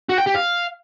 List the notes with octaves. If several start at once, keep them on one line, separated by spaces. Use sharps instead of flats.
F#4
G5
G4
F5